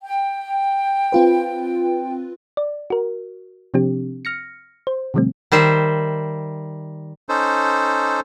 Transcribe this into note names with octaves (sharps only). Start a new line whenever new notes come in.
G5
C4 F4 B4
D5
F#4 A#4
C3 F3 C4 D4 G4
F6 A#6 C#7
C5
B2 D3 F3 G3 A3 C4
D#3 G3 C5 E5
C#4 D#4 A4 C5